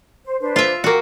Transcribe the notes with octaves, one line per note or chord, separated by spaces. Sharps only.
C5
D4 B4 C5
F4 E5
A#3 F#4 G5